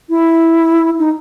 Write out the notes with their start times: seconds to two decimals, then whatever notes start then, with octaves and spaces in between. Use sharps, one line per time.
0.10 E4
0.99 D#4